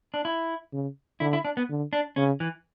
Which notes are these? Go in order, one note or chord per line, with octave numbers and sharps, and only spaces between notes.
D4
E4
C#3
D3 E4
E4
D4
B3
D3
D4
C#3 C#4
E3